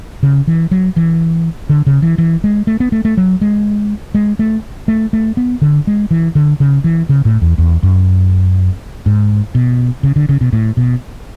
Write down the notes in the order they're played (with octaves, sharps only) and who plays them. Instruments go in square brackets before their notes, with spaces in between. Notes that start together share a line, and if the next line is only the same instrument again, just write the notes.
[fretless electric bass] C#3
E3
F#3
E3
D3
C#3
E3
E3
G#3
A3
B3
A3
A3
F#3
G#3
G#3
A3
A3
A3
B3
D3
G#3
E3
D3
C#3
E3
C#3
A2
E2
E2
F#2
G#2
B2
C#3
D3
C#3
B2
A2
B2